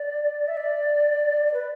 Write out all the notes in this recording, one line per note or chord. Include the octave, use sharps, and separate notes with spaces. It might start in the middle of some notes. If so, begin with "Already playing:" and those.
Already playing: D5
E5
D5
D5
B4